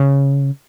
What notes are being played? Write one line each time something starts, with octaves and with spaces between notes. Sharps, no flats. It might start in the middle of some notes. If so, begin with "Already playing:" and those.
Already playing: C#3